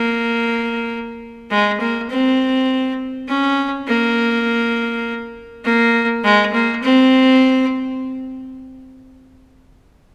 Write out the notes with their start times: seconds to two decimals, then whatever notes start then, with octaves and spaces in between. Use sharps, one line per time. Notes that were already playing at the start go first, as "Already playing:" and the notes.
Already playing: A#3
1.50 G#3
1.80 A#3
2.10 C4
3.28 C#4
3.88 A#3
5.65 A#3
6.24 G#3
6.54 A#3
6.83 C4